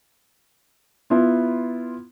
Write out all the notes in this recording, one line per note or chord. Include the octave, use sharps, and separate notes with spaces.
B3 E4 F4